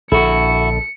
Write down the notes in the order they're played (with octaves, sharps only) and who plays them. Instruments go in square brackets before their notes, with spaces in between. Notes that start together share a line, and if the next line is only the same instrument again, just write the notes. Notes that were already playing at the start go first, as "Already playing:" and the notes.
[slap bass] A#1 [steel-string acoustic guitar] D3 A4 [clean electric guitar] E4 F#4 [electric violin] C#7